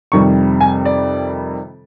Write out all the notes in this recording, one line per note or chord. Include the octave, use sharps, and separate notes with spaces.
F2 C3 D#3 G3 C#6
G#5
D5